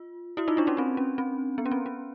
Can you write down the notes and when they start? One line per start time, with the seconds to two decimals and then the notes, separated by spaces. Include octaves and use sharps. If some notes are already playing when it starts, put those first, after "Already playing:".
Already playing: F4
0.37 E4 F#4
0.48 D#4 F4
0.57 D4 E4
0.67 C#4 D#4
0.77 C4 D4
0.97 C#4
1.18 C4
1.58 B3
1.66 C#4
1.71 C4
1.86 C#4